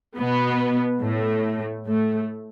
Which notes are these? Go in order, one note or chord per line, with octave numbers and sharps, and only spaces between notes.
B2 B3
A2 A3
A2 A3